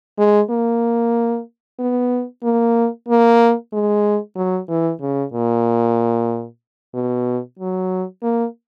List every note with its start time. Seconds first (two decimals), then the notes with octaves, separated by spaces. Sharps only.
0.18 G#3
0.50 A#3
1.79 B3
2.43 A#3
3.09 A#3
3.73 G#3
4.36 F#3
4.69 E3
5.01 C#3
5.33 A#2
6.94 B2
7.59 F#3
8.23 A#3